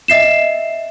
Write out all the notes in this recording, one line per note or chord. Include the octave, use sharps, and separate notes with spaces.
D#5 E5 C7 E7